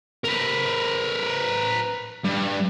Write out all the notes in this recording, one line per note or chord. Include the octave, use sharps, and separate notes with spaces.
A#4 B4
G2